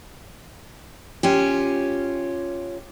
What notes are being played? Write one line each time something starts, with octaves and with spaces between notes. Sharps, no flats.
C#4 F4 G4